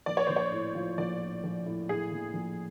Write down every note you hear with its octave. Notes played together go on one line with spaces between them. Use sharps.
A#1 D5
C#5
A#1 C5
C#5
A2
F3
A#1 D5
A2
A#1
A2
A2 G#4
A#1
A#1